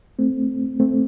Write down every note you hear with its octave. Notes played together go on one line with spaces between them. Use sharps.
A3 C4
A3 C4